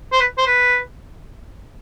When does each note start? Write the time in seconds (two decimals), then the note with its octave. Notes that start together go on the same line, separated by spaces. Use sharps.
0.12 C5
0.20 B4
0.38 C5
0.47 B4